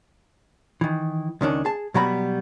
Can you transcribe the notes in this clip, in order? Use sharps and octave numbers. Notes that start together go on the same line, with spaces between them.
D#3 E3
C#2 D#3 C#4 D4
G#4 A5
B2 F#3 G3 B3 A#5 B5